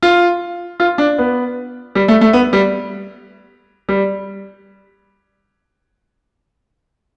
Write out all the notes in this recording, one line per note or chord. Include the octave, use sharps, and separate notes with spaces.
F4
F4
D4
B3
G3
A3
A3
B3
G3
G3